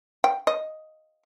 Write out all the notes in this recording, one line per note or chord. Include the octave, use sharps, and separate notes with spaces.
G5
D#5